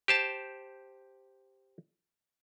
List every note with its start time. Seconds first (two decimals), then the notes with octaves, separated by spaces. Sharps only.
0.08 G4 C5 A5